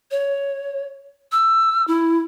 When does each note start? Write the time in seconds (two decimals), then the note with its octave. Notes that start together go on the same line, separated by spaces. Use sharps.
0.11 C#5
1.32 E6
1.88 E4